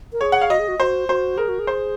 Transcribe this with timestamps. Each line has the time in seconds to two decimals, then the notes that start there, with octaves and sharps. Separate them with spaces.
0.13 A#4
0.21 G#4 C#5
0.32 F#5
0.42 F5
0.50 F#4 D#5
0.59 G#4
0.68 F#4
0.79 F#4 C5
1.09 F#4 C5
1.37 G#4 A#4
1.49 F#4
1.59 G#4
1.67 C5